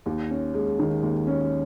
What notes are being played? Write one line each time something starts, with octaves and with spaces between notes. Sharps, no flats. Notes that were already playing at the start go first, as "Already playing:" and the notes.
D#2
C#4
G#3
D#3
D#2
C#4